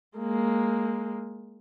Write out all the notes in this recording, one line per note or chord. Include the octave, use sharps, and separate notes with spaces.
G#3 A#3